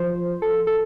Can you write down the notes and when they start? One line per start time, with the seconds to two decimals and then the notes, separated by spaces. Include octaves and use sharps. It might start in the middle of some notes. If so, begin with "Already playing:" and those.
Already playing: F3 C5
0.42 A4
0.67 A4